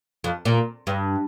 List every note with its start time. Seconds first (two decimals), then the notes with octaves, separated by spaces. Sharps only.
0.24 F2
0.45 A#2
0.87 G2